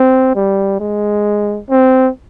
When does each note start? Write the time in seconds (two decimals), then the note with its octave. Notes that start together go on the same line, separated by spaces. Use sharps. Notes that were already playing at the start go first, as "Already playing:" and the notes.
Already playing: C4
0.35 G3
0.79 G#3
1.69 C4